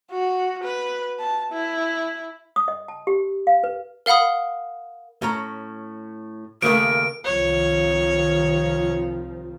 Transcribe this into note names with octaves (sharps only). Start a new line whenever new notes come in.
F#4
B4
A5
E4
D#6
D#5
A5
G4
F5
B4
A#4 F5 F#5 B5 D#6
A2 C#4 A#5
D#2 C#3 A3 A#4 D7
C2 D#3 F3 C#5